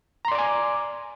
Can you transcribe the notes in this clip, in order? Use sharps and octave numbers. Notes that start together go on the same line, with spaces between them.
D5 G#5 A#5 C6 D6